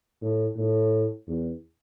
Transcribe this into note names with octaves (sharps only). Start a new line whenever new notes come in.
A2
A2
E2